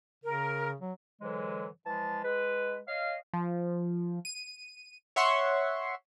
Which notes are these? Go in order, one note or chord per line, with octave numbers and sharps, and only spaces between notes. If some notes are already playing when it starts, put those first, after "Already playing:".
C#3 A#4
F#3
G#2 D3 E3 F#3 G#3
E3 F3 G#3 A5
G#3 B4
C#5 D#5 F5
F3
D#7
C#5 E5 F#5 C6 C#6